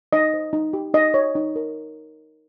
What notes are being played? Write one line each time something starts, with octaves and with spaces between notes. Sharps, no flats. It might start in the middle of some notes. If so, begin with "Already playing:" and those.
D#4 D#5
C5
D#4
G4
D#4 D#5
C#5
D#4
A#4